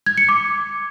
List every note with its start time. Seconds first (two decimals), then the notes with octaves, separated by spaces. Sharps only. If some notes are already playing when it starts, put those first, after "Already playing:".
0.06 G#6
0.18 C#7
0.29 D6